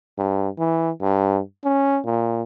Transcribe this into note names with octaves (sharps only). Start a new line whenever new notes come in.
G2
E3
G2
C#4
A#2